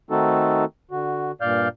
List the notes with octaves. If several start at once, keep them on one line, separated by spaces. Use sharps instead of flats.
D#3 A3 C4 D#4 F#4 A4
D3 F#4
G2 A#2 D5 F5 F6 G6